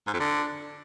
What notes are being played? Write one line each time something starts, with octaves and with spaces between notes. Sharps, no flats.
G#2
F2
D3